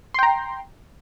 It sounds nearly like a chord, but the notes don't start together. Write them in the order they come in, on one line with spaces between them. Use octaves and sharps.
C6 G5 A#5